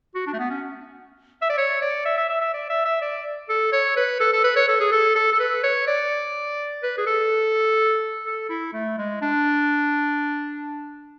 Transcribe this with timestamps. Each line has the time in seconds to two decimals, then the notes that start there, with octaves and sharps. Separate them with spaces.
0.15 F#4
0.27 D4
0.34 A3
0.39 B3
0.50 C#4
1.42 E5
1.50 D5
1.58 C#5
1.82 D5
2.06 E5
2.18 E5
2.29 E5
2.41 E5
2.54 D5
2.70 E5
2.85 E5
3.02 D5
3.49 A4
3.73 C#5
3.97 B4
4.20 A4
4.33 A4
4.44 B4
4.57 C#5
4.69 A4
4.80 G#4
4.92 A4
5.16 A4
5.33 A4
5.40 B4
5.64 C#5
5.87 D5
6.83 B4
6.98 G#4
7.07 A4
8.26 A4
8.50 E4
8.74 A3
8.98 G#3
9.22 D4